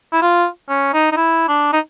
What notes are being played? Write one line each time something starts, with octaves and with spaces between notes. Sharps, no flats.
E4
F4
C#4
D#4
D#4
E4
D4
D#4